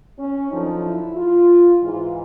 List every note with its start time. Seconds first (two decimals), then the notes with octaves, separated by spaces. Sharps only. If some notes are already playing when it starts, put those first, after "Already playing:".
0.18 C#4
0.50 F#2 D3 F3 D#4
0.83 E4
1.15 F4
1.81 G#2 E3 F4